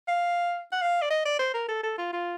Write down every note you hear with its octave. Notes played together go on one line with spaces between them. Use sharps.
F5
F#5
F5
D5
D#5
D5
C5
A#4
A4
A4
F4
F4